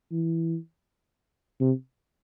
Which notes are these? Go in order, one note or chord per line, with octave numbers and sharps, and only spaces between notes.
E3
C3